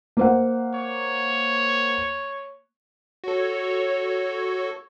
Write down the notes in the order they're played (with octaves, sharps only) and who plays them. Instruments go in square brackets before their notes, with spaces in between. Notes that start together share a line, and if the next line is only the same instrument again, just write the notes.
[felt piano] A#3 C5 F#5
[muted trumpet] C#5
[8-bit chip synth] F#4 A4 [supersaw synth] C#5